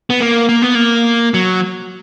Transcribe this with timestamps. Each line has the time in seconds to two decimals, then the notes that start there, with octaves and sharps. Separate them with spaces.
0.10 B3
0.21 A#3
0.49 A#3
0.62 B3
0.75 A#3
1.34 F#3